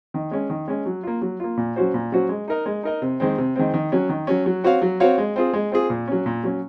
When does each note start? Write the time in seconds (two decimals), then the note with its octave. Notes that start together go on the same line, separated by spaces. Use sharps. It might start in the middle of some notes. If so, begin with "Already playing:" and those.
0.14 D#3
0.31 G#3 C#4
0.50 D#3
0.68 G#3 C#4
0.86 F#3
1.03 A#3 F4
1.22 F#3
1.40 A#3 F4
1.57 A#2
1.76 F#3 C#4 F#4 C5
1.94 A#2
2.12 F#3 C#4 F#4 C5
2.29 G#3
2.48 D#4 A#4 D#5
2.66 G#3
2.83 D#4 A#4 D#5
3.02 C3
3.20 D#3 G#3 C4
3.38 C3
3.56 D#3 G#3 C4
3.74 D#3
3.92 F#3 C#4
4.09 D#3
4.27 F#3 C#4
4.46 F#3
4.64 C4 F#4 C#5 F5
4.82 F#3
5.00 C4 F#4 C#5 F5
5.18 G#3
5.36 C4 F4 G#4
5.53 G#3
5.72 C4 F4 G#4
5.90 A#2
6.08 F#3 C#4
6.26 A#2
6.44 F#3 C#4